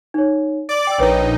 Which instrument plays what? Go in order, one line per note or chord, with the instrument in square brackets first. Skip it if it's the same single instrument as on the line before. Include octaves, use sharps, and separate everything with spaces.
[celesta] D#4 C#5
[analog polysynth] D5 D6 [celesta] D7
[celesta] G5 E6
[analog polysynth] A#1 D#4 [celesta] B4 C#5 G5